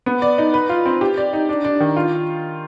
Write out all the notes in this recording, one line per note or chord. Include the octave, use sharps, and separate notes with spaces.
B3
D5
D#4
B4
F4
C4
G4
D5
D#4
D4
D4
D#3
F4